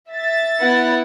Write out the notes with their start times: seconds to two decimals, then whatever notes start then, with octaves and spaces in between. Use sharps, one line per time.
0.11 E5 A6
0.60 B3 E4 F#5